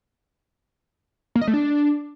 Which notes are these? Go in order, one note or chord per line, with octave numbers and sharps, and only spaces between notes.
A#3
D#5
A3
D4